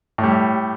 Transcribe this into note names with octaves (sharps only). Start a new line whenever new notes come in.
A2
G3